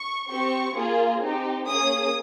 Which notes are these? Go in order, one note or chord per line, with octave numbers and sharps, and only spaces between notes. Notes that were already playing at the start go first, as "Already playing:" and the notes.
Already playing: C#6
C4 G4 C#6
A#3 F4 G#4
C4 D#4 G4
A#3 C#4 G#4 D#6